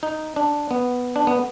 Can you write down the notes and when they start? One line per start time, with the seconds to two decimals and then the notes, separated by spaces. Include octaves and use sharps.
0.03 D#4
0.36 D4
0.71 B3
1.16 D4
1.27 B3